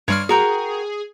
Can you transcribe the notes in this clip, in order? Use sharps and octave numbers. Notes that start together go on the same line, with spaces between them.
G2 G3 C#5 D5 C6 F6
F#4 G#4 A#4 G5